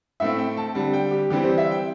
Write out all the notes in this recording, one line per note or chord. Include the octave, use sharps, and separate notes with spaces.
A2 A3 C4 E5
G5
A5
D3 G3 C4
G5
G4
E3 G3 C4 G4
C5
E5
G5